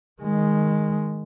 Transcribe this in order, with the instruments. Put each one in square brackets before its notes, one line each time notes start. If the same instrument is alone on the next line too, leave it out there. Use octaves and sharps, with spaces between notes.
[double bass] D#3 G#3